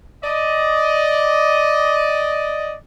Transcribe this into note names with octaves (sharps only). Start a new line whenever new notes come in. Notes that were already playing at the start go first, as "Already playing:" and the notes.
D5 D#5